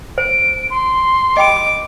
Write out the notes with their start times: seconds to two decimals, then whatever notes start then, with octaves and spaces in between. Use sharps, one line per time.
0.18 C5 D7
0.70 C6
1.37 D#5 G5 B5 D6